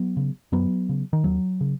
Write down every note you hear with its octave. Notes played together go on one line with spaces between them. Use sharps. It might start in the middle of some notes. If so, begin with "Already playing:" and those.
Already playing: F#3 B3
C#3
F#2 F#3 B3
C#3
D#3
D#2 F#3
C#3